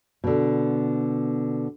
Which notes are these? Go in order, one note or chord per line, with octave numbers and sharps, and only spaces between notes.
B2 D3